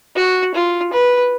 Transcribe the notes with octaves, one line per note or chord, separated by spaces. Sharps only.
F#4
F4
B4